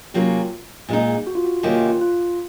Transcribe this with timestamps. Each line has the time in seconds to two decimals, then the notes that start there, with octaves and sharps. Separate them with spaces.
0.14 C3 F#3 A#3 C#4 F4
0.89 A#2 G#3 D#4
1.27 F#4
1.35 F4
1.44 F#4
1.63 C3 D#3 A#3 C#4 F4
1.76 F4
1.88 F4
2.01 F4